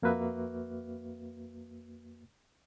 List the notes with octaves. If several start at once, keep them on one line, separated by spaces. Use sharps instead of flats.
F2 A#3 F#4 B4 E5